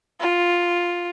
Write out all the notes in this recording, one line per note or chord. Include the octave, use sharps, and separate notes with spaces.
F4